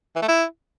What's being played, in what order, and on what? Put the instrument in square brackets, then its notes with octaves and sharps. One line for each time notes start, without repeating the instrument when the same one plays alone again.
[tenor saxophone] E3
A3
E4